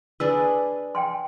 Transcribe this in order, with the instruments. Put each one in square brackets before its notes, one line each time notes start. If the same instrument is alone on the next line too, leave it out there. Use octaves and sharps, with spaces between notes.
[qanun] D4 G#4 B4 [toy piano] E6
[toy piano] G5 G#5 C6